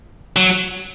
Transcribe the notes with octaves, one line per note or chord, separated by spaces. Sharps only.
F#3